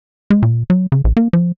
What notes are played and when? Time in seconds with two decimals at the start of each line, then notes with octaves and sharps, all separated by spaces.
0.30 G#3
0.42 A#2
0.70 F#3
0.92 C#3
1.04 A#1
1.17 A#3
1.33 F3